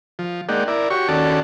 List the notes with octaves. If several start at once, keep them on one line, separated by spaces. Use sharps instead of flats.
F3
G#3 A#3 D#4 D5 F#5 G5
E4 A#4 D5
F#4 G4 C#5 C#6
D#2 C#4 F#4 A4 D5 A5